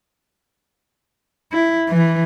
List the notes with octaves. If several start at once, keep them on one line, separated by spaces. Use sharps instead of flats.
E4
E3